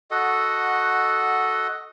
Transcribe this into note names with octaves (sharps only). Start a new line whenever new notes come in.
F#4 A4 D#5 F#5